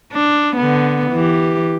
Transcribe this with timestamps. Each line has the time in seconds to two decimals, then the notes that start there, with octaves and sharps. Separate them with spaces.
0.13 D4
0.56 D3 B3
1.12 E3 G4